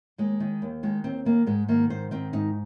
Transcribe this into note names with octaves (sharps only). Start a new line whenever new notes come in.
D#2 G#3
D#3
D#2
D#3 G#3
D#2 C4
D#3 A#3
G#2 G#3
D#3 A#3
G#2 C5
D#3 C4
G#2 D#4